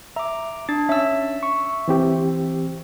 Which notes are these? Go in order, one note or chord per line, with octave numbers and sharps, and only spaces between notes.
E5 A#5 D6
D4 A6
C#4 E5 E6
C#6
E3 C4 G4